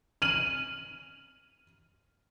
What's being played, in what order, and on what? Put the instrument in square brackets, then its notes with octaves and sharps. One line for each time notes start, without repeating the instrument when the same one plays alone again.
[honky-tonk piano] F6 D#7 F#7